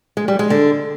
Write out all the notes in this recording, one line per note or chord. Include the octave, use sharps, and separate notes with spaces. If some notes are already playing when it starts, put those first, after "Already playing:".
G#3
G3
G#3
D3